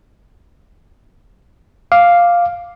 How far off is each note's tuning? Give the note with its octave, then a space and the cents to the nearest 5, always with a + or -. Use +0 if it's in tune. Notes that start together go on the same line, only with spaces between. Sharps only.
F5 +0 D6 +0